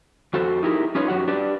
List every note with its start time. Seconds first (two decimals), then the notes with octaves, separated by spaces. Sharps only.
0.33 F2 F#4 A4 C5
0.63 D#4 E4 G4 G#4 A#4
0.95 C#4 D#4 F4 B4 C#5
1.08 F#2 F#3 F#4 G4 F#5
1.28 D4 G4 B4 D5